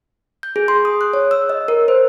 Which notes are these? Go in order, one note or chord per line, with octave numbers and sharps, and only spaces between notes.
G6
G#4
C6
D#6
F#6
C#5
E6
D#5
A#4
C5